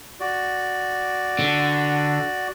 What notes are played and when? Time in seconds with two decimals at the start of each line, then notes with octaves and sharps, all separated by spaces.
0.20 F#4 D5
1.39 D3